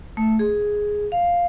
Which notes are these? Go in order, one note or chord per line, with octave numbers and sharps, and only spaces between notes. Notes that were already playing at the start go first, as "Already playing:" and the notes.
A3
G#4
F5